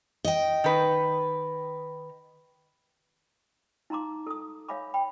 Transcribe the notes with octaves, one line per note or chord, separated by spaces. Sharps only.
D#5 G5
D#3 B4
D#4 F5 A#5 C6 D6
A4 D#6
C#5 E5 F5 G#5 B5 D6
G5 B5